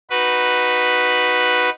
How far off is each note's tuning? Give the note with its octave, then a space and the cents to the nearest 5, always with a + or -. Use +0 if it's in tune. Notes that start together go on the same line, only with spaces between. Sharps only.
D#4 +0 F#4 +0 B4 +0